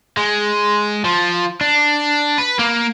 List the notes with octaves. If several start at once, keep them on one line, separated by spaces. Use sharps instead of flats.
G#3
F3
D4
B4
A#3